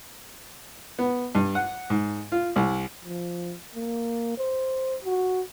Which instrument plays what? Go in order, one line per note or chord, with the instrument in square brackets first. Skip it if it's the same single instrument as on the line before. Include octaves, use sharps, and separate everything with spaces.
[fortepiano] B3
G2
F#5
G#2
F4
C2
[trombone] F3
A#3
C5
F#4